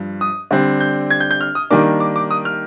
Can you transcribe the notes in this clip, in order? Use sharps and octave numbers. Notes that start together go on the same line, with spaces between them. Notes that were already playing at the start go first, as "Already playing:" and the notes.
Already playing: G2 F3
D#6
D3 G3 C4
G6
G#6
G6
G6
F6
D#6
D#3 G3 A#3 D4 D6
D6
D6
D#6
F6